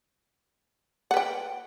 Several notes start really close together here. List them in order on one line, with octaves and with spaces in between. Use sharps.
F#5 B4 G5